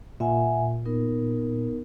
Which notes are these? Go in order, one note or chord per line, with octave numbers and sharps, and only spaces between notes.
A#2 E5 F#5 G#5
B3 D#4 A#4